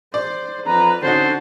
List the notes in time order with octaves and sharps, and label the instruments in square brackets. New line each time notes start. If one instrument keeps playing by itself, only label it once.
[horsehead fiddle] C5 [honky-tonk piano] D5
[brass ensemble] F2 A#5 [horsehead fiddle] B4
[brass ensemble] D3 [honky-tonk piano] C4 C#4 D#4 [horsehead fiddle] F#4 A5 [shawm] C5